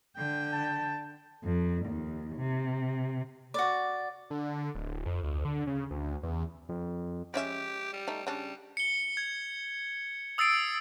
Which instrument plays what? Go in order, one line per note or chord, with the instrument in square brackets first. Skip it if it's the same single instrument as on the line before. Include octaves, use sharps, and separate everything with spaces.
[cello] D3 G5
[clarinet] A5
[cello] F2
D#2
C3
[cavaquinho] F#4 D5
[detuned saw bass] D3
D1
F2
D2
D3
C#3
D2
E2
[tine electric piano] F2
[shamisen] G#3 C#4 E5 [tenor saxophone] G4
[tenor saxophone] G3
[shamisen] A3 D#4
[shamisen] C#3 D4 [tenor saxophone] G3
[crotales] C#7 G7
G#6
D#6 E6 A6 C7 D7